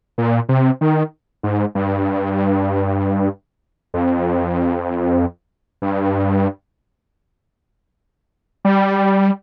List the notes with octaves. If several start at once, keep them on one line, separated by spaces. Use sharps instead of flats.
A#2
C3
D#3
G#2
G2
F2
G2
G3